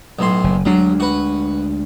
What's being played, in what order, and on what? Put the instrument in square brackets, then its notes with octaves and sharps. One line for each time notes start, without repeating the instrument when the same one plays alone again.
[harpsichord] B1 A2 C6
[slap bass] F#1
[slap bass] D2 G#3 D4 [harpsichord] F#3
[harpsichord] F#4 B4